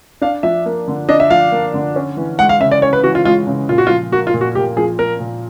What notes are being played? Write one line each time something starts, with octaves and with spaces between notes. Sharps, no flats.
D4 F5
F3 E5
A#3
D3
D4 D#5
E5
F3 F5
A#3
D3
C#4
E3
G#3 F#5
F5
C#3 E5
D5
C#4 C#5
B4
E3 F#4
F4
G#3 F4
C#3
A#2 F4
F#4
F4
F3
A#3 F#4
F4
A#2
F#4
A#2 G4
F3 G#4
A#3 A#4
A#2